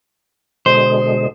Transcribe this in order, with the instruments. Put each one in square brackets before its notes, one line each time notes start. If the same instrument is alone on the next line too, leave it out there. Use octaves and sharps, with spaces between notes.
[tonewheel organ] B2 D3 G#3 [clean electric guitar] C5